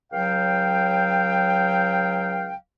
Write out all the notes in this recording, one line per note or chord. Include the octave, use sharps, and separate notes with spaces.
C#2 F#3 F5 G5